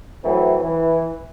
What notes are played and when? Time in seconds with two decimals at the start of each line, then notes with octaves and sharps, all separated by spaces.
0.25 E3 F#3 A3 C4
0.61 E3